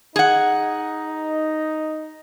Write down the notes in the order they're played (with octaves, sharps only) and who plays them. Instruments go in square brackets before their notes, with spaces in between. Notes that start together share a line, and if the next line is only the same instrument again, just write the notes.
[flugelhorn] D#4 [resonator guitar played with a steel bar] G#4 F#5